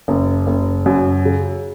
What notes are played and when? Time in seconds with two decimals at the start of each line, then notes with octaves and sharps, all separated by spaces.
0.08 F#1
0.47 F#1
0.86 F#2
1.25 C#3